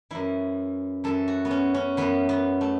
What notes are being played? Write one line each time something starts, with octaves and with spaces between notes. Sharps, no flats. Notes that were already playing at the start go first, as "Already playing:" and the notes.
F#2 E3 E4
F#2 E3 A4
F#4
B3
C#4
C#4
F#2 E3 B3
B3
A3